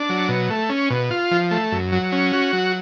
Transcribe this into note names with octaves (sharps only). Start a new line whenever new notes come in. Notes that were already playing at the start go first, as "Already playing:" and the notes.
Already playing: D4
F#3
B2
A3
C#4
B2
F4
F3
A3
F#2
F#3
C#4
F#4
F#3